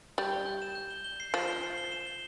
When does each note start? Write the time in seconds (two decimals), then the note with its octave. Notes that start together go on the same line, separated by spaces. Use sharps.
0.18 G3 G6
0.32 G7
0.46 G6
0.62 E7
0.75 G6
0.91 G7
1.04 G7
1.20 C7
1.34 F3 E7
1.48 G7
1.63 C7
1.78 G7
1.92 E7
2.07 G7